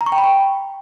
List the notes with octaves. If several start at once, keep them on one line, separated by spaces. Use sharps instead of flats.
A#5
C#6
G5
B5
G5